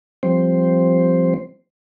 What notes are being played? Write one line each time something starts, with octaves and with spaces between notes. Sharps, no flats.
F3 G3 C4 C5